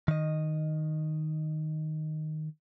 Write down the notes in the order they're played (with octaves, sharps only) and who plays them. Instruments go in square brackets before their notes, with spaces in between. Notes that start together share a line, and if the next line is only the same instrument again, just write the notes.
[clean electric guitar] D#3 D#5